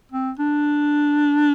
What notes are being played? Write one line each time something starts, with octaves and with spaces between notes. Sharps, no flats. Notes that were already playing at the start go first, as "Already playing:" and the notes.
C4
D4